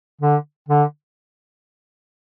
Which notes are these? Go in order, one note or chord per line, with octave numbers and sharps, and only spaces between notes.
D3
D3